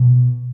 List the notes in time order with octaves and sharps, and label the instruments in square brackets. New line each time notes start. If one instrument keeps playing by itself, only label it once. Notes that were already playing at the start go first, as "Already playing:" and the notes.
Already playing: [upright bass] B2